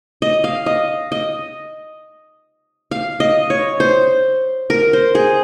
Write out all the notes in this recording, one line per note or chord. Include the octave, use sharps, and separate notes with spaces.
D#5
F5
D#5
D#5
F5
D#5
C#5
C5
A#4
C5
G#4